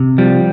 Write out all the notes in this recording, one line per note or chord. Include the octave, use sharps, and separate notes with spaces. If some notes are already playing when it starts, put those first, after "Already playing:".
Already playing: C3
F3 G3